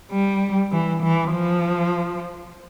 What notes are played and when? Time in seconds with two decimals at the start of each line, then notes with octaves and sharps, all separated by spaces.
0.11 G3
0.72 E3
1.02 E3
1.32 F3